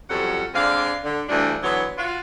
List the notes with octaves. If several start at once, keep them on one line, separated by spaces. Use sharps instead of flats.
F2 F#3 G3 C#4 A4 F#5
D3 G#3 C4 D5 F5
D3
D2 G2 E3 D4
D3 E3 F#3 B3
F4 F#4